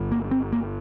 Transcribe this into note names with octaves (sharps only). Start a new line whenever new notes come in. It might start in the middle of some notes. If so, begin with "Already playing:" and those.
Already playing: G1 G2 D3
A#3
C4
A#3